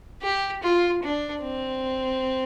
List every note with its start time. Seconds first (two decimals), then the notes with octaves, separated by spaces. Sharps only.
0.22 G4
0.62 F4
1.02 D4
1.43 C4